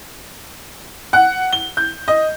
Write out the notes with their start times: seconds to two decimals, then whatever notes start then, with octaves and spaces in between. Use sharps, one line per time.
1.13 F#5
1.53 G7
1.77 G6
2.08 D#5